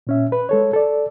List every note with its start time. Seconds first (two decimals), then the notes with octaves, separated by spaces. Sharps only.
0.07 A#2 C#4 E5
0.32 B4
0.49 G#3 A4 C#5
0.73 A4 D5